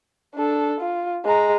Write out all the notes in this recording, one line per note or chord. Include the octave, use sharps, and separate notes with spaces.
D4 A4
F4
G#3 A#5